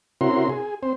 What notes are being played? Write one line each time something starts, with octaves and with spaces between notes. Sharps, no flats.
C3 C#4 E4 F#4 A#4 C6
G#4
C4 C5